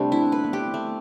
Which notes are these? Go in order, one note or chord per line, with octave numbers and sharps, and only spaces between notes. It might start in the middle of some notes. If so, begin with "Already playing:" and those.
Already playing: C3 G3 A3 C4 D4
E4
B3
B4
B3
C4 G4
A3